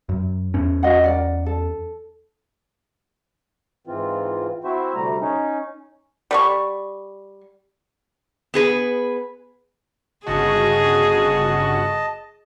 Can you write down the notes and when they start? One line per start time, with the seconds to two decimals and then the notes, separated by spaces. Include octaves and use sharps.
0.09 F#2
0.54 E2 C#4
0.83 F#4 D#5 F#5
1.04 A#4 D5 F#5
1.46 A4
3.87 G#2 E3 C4 F4
4.64 C4 E4 F#4 C5 E5
4.95 D2 C3 G3 A3 A#5
5.21 C#4 D#4
6.31 G3 B4 C#6
8.54 B3 G#4 B4
10.27 G1 C#3 F#4 G#4 D#5 A5